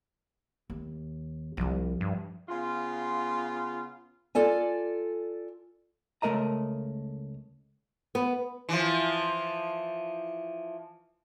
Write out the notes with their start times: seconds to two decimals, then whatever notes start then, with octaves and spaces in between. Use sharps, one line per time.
0.70 D#2
1.57 C2 F3 G3
2.01 G2
2.48 C#3 B3 F4
4.35 F4 A4 D5 G#5
6.22 C#2 A3 A#4 D#5 A#5
8.15 B3
8.69 E3 F3